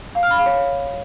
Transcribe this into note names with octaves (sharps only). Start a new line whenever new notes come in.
F5
F6
B5
F5
C#5